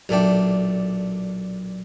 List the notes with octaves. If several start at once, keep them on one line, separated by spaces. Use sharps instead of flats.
B1 A#2 A3 D4 G5